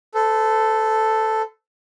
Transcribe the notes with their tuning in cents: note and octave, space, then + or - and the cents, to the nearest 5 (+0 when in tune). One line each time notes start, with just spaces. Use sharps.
A4 +0 C5 -45